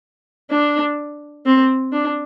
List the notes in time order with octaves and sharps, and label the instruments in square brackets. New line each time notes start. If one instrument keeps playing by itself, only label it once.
[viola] D4
C4
D4